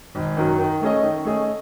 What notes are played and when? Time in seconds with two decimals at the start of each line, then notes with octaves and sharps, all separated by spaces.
0.15 G#1
0.37 F#2 D#3 F#3
0.59 D#3
0.81 A3 C#4 G#4 D#5
1.03 D#3
1.25 A3 C#4 G#4 D#5